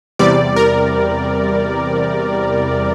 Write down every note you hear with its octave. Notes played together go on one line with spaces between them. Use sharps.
E2 C3 G3 D5
A#4